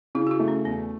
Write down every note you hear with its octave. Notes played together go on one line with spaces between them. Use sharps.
C#3 E4
F#4
E4
A3
C#4
E2 B3